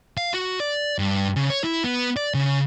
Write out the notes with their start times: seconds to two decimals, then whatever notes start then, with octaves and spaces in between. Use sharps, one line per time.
0.18 F5
0.34 F#4
0.60 D5
0.99 G2
1.36 C#3
1.50 C#5
1.64 E4
1.84 B3
2.17 D5
2.34 C#3